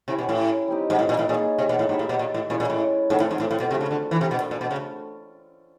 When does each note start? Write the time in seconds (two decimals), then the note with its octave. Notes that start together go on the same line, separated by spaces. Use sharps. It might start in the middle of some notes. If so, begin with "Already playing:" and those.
0.08 C3 C#4 E4 G4 A#4
0.19 B2
0.29 A2
0.68 G3 C4 D#4 G4
0.90 G#2
0.99 A2
1.09 A#2
1.19 A2
1.28 A#2 A#3 D#4 G#4 C#5
1.58 C3
1.69 B2
1.79 A2
1.89 G#2 D#4 G4 B4 E5
1.99 A2
2.09 B2
2.19 A#2
2.34 A2
2.49 A#2 G#3 C#4 E4
2.60 A#2
2.70 A2
3.10 G#2 A3 C4 F4 A4
3.20 A2
3.31 G#2
3.40 A2
3.51 A2
3.60 B2
3.70 C3 F3 A3 D4 F#4
3.81 C#3
3.91 D3
4.11 E3
4.21 C3
4.31 B2 D4 F#4 A4
4.40 A#2
4.51 A#2
4.61 B2
4.71 C#3